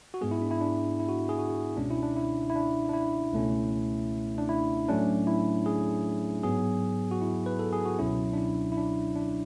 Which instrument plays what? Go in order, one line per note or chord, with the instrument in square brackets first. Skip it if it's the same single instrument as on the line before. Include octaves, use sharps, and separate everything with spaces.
[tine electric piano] F#4
G#2 G#3 B3 G#4
E4
D4
E4
D4
E4
F#4
G#4
F#4
C#2 B2 G#3 C#4 D4
E4
D4
E4
E4
D4
D4
E4
C#2 B2 A3 C#4
D4
E4
A2 F#3 A3 C#4 D4
E4
G#4
G#2 F#3 B3 G#4
F#4
E4
B4
A4
G#4
F#4
C#2 B2 F#3 C#4 E4
D4
E4
E4
D4
D4